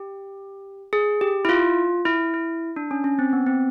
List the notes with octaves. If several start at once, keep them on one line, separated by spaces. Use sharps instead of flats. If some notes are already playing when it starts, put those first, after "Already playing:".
Already playing: G4
G#4
G4
E4
F4
E4
E4
D4
C#4
C#4
C4
B3
C4